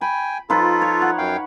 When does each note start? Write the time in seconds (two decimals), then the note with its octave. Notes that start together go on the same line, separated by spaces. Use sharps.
0.01 G5 G#5 B5
0.50 F3 D#4 F4 A4 B4
0.82 C#5
1.02 F#5
1.18 F#2 F5 G5